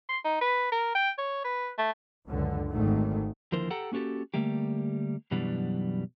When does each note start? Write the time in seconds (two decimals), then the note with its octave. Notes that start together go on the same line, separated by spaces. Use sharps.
0.09 C6
0.24 D#4
0.41 B4
0.72 A#4
0.95 G5
1.18 C#5
1.44 B4
1.78 A3
2.28 C#2 F#2 D3
2.69 G#1 G#2 D#3 A3
3.52 D#2 D3 F3 E4 A#4 C5
3.70 G4 A4 F#5 G5 A#5
3.92 A#3 C#4 F#4 G4 A4
4.34 D3 G3 A3 A#3 G4
5.31 F#2 B2 E3 F#3 G3 D4